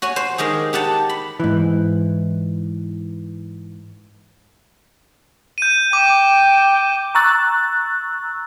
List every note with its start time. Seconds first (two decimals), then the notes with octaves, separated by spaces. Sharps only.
0.02 F#4 C#5 G#5
0.16 C5
0.38 D#3 G#3 G4 G#4
0.73 D#4 G4 F#5 A5
1.09 B5
1.40 G#2 E3
5.58 G6 D#7
5.93 G5 D6
7.15 A#5 C#6 E6 F#6 A6